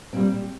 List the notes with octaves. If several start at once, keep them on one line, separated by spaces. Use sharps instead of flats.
A#2 G3 C4